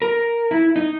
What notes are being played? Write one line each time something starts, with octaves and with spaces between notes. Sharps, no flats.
A#4
E4
D#4